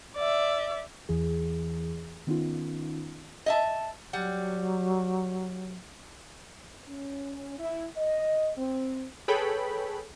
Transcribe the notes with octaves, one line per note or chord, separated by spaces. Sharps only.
D5 E5
E2 E3 G#4
D#3 B3 C#4 D#4 F4
D#5 E5 A5
F#3 G3 F#5
C#4
E4
D#5
C4
G#4 A4 B4 C#5 G5 B5